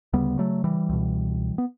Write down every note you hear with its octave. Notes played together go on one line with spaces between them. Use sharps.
D2 C#3 G3 B3
F#3 A3
E3 G3
C#2 B2
B3